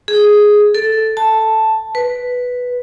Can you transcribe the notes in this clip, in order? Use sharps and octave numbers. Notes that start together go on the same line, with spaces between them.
G#4
A4
A5
B4